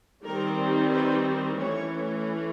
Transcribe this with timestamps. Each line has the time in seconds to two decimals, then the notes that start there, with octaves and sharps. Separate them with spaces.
0.24 D#3 G3 C4 A#4
0.91 B4
1.58 E3 A3 C#4 C#5